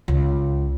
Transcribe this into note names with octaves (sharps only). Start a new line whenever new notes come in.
C#2